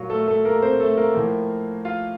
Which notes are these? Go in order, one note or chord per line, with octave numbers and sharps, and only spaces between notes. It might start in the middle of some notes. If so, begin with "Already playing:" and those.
Already playing: A#2 F#3 F4 F#4
A3 A4
A3 A4
A#3 A#4
C4 C5
A3 A4
A#3 A#4
A2 F3
F4 F5